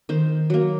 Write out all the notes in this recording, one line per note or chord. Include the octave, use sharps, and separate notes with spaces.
D#3 C5
F#3 A#3